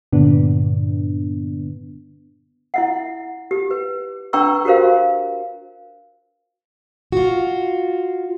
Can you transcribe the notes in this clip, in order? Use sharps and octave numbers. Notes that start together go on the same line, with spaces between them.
G2 A#2 D3 B3 D4
E4 E5 F#5
G4
B4
D4 B4 G5 A#5 C#6 E6
F#4 G4 A#4 C5 F5
F4 F#4